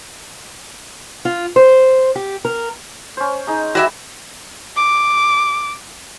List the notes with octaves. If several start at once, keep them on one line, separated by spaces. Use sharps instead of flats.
F4
C5
G4
A#4
C#4 C5
D#4 G#4 A#5
G3 F#4 D5 E5 G#5 B5
D6